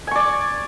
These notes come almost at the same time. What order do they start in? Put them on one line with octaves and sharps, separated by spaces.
G#5 C#6 D5